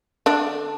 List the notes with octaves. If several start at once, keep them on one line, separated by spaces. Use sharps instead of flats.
D3 D4